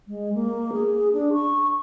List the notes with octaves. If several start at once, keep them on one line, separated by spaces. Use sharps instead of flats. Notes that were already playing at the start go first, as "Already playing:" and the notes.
G#3
A#3
G#4
D4
C#6